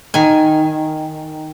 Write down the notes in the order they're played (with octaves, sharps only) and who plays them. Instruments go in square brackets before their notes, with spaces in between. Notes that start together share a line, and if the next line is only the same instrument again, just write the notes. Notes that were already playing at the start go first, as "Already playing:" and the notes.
[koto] D#3 G#5